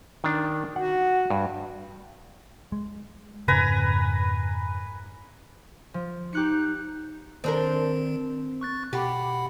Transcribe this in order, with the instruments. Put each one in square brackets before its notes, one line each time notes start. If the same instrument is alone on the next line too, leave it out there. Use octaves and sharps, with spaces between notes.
[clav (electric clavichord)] D#3 D4
[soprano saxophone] F#4 [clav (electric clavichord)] F#5
[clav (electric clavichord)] G2
[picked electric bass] G#3
[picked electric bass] F2 G#2 C#3 [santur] B4 G#5 A#5
[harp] F3
[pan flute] D#4 [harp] G4 F#6 C#7
[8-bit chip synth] D#3 [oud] C4 D4 A#4
[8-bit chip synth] C#6 F#6 A6
[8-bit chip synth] B2 F#5 B5 [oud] G4